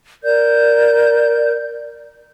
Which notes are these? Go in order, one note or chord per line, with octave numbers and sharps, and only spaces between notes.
A#4 D5 G6